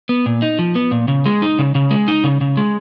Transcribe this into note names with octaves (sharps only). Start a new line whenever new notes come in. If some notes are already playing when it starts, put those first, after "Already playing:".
B3
A#2
D#4
F3
B3
A#2
C#3
G#3
D#4
C#3
C#3
G#3
D#4
C#3
C#3
G#3